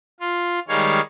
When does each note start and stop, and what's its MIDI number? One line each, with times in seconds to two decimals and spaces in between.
0.20 0.59 65
0.68 1.00 51
0.68 1.00 55
0.68 1.00 56
0.68 1.00 73
0.68 1.00 77